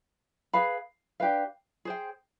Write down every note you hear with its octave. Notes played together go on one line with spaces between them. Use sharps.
G#4 B4 F5 B5
D4 G4 B4 F5
G#4 C5 G5